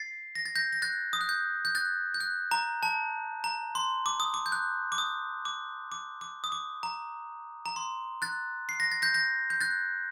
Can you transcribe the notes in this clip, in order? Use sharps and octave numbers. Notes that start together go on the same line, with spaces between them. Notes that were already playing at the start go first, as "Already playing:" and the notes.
Already playing: A6 C7
A#6
A6
G6 A#6
A#6
F#6 A6
D#6
F#6
G6
G6
F#6 A6
G6
F#6
A#5
A5
A#5
C6
D6
D#6
D6
G6
F#6
D6
D#6
D6
D6
D6
D#6
D6
A#5
A#5
C6
F#6 A6
C7
A#6
A6
G6 A#6
G6 A#6
G6
F#6 A6